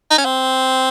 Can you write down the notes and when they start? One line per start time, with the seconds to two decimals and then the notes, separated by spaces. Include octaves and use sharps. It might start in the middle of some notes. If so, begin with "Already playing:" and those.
0.11 D#4
0.18 C#4
0.25 C4